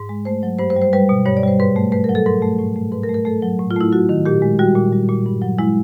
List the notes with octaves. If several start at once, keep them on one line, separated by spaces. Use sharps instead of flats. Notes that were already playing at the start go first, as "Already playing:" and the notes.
Already playing: G#2
G#3
A3 C5
F#3
G2 C5
C5
G3
C5
G3 B4
B2
G2 C#5
D5
G3 C5
G#2 B4
A3
A3 B4
A#4
F#3
A4
G#2 A#4
A3
A2
A3
G#2 B4
A#4
A3
A#4
A3 A4
F#3
A2
F4
A3 E4
F#3 F#4
D#3
A#2 G4
G#3
G3 F#4
A#2
G3
A#2
G2
F#3
G#3 E4